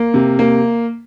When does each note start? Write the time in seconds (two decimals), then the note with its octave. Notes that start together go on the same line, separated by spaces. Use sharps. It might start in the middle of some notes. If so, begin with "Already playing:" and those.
Already playing: A#3
0.14 C3
0.39 A#3